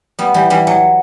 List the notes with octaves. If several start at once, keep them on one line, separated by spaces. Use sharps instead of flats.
G3 B3
E3 G3
E3 G3
F#3